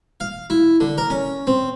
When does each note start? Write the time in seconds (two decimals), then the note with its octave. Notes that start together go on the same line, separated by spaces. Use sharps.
0.20 F5
0.50 E4
0.80 D3
0.98 A#4
1.10 C#4
1.47 C4